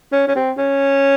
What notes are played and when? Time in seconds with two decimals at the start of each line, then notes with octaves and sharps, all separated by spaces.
0.12 C#4
0.27 C#4
0.35 C4
0.58 C#4